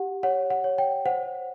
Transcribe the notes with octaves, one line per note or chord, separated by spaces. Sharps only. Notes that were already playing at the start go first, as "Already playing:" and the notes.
Already playing: G4 F#5
C#5 F#5
F#5
C#5
G5
C5 F#5